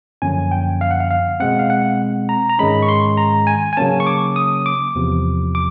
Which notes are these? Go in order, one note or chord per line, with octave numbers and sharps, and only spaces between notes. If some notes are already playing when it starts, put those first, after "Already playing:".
F#2 D3 F3 A#3 C#4 G#5
G5
F5
F#5
F5
F5
B2 G#3 C4 F#5
F5
F#5
A#5
A#5
G#2 D#3 G#3 C#4 B5
C#6
C6
A#5
G#5
G#5
C#3 F#3 A#3 C#4 A5
C#6
D6
D#6
D6
E2 C3 F3
D6